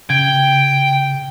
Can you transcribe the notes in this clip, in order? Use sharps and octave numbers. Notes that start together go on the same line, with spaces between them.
C#3 G5 G#6